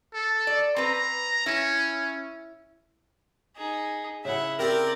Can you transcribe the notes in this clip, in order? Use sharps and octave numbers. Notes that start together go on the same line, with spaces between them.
A4
D5
C4 B4 A#5
C#4 E4
D#4 G#4
C#3 E4 E5 F#5
C4 G4 A#4 D5